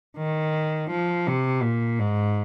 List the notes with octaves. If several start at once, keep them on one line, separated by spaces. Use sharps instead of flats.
D#3
F3
C3
A#2
G#2